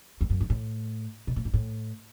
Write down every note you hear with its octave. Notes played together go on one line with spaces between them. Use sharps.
E2
F#2
G#2
A2
B2
A2
G#2
A2